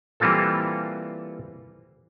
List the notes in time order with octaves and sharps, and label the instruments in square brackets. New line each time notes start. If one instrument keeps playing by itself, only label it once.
[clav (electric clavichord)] E3 G3 A#3 C4 F4 A4